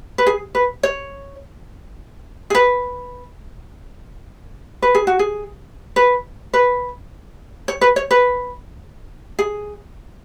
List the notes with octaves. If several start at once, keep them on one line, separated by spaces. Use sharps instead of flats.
B4
G#4
B4
C#5
G#4
B4
B4
G#4
F#4
G#4
B4
B4
C#5
B4
C#5
B4
G#4